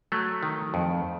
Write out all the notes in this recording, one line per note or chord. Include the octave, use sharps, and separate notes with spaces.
F#3 A3
D#3
F2